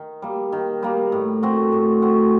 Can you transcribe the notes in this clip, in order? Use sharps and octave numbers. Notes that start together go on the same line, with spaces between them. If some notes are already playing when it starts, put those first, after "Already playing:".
Already playing: D#3
G3 A#3
D#3
G3 A#3
A2
A3 C4 F#4
A2
A3 C4 F#4